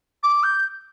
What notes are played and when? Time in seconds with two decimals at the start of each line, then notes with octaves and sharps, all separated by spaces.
0.23 D6
0.43 G6